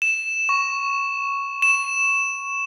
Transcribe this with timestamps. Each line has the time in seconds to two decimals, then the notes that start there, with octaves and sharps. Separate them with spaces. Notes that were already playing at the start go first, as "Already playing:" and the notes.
0.02 E7
0.49 C#6
1.62 E7